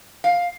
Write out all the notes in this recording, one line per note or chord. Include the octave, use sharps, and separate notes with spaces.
F5